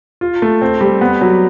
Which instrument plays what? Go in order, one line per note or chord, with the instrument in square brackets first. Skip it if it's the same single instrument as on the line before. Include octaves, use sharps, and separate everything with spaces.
[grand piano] F4
A3
C4
G3
B3
F#3